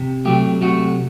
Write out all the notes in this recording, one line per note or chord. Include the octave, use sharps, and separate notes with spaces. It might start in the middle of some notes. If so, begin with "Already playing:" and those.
Already playing: C3
C3 F#3 A3 G4
C3 F#3 A3 F#4